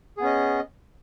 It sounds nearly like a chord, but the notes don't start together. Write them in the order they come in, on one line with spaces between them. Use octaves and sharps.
G#4 B3 C#4 D#5